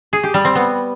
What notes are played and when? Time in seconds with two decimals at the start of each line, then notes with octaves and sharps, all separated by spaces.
0.13 G#4
0.23 G4
0.34 G3
0.45 C4
0.55 B3